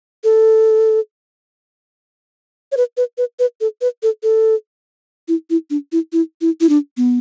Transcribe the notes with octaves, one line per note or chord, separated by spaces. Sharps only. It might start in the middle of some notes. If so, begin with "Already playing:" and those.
A4
C#5
B4
B4
B4
B4
A4
B4
A4
A4
E4
E4
D4
E4
E4
E4
E4
D4
B3